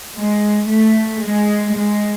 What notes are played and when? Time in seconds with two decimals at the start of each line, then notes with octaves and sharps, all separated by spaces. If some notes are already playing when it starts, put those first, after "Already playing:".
0.17 G#3
0.70 A3
1.22 G#3
1.75 G#3